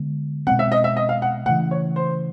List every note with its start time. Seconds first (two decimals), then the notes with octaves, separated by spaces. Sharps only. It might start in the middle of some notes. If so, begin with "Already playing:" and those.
Already playing: D3 G#3 B3
0.47 B2 G#3 C4 F#5
0.59 E5
0.72 D#5
0.84 E5
0.97 D#5
1.09 F5
1.22 F#5
1.46 A3 F#5
1.49 C#3 E3
1.71 C#5
1.96 C5